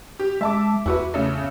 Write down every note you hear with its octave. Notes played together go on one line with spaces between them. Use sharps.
G4
G#3 E5 A5 D6
E2 E4 F#4 B4
C#3 A3